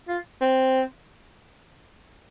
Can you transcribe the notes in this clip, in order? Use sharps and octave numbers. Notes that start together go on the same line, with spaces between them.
F4
C4